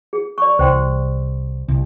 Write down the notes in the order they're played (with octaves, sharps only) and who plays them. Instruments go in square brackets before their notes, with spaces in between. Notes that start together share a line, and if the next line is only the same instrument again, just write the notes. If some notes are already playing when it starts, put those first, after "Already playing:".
[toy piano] G#4
D5 C#6
[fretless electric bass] C2 [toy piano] C5 G5 C6
[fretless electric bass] C2